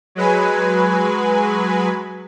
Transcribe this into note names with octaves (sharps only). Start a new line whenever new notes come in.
F#3 G#3 B4 G#5